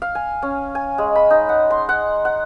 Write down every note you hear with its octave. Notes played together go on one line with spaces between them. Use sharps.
F5
G#5
C#4
G#5
G#3
B5
D#4
F#5
C6
F#5
F#5